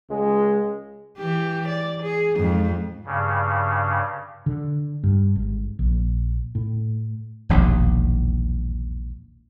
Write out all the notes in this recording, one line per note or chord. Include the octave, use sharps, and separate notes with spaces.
C#2 G#3
E3 G4
D5
G#4
F2 G#2
G2 C#3
D3
G2
G#1
A#1
A2
E1 A#1 D#2